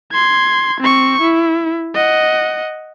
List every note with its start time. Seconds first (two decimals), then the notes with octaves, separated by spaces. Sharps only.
0.11 C6 G#6
0.81 C4 C#6
1.21 E4
1.95 D#5 F#5